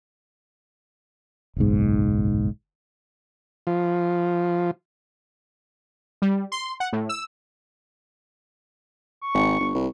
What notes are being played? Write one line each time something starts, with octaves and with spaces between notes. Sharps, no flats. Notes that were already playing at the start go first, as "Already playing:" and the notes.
F#1 B1 G#2
F3
G3
C6
F#5
A2
E6
C#6
G#1
G1
C2